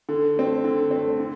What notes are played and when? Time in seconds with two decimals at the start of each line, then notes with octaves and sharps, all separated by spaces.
0.09 D3
0.36 A3 C4
0.64 D3
0.91 A3 C4
1.20 D3